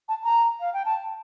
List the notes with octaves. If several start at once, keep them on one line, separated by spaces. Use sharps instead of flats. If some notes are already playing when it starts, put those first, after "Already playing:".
A5
A#5
F5
G5
A5